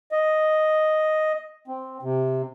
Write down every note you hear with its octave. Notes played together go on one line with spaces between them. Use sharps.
D#5
C4
C3